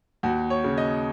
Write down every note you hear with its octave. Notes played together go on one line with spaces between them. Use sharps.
D#2 F#4
C#5
C#3
D#5